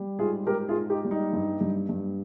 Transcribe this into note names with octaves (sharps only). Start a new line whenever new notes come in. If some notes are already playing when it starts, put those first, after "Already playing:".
Already playing: G3
G#2 F4 G#4
G#2 G4 A#4
F4 G#4
G#2
D#4 G4
G3
D#4
G2
G2
G2